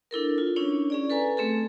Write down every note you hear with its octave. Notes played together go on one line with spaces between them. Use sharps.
D4 E4 A4 A#4
F4
C#4 D4 E4 C#5
C#4 G#4 D5
A4 B4 G#5 A#5
A3 C4 G#4 A4